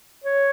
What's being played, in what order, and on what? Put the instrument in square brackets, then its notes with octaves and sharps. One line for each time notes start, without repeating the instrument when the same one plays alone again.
[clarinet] C#5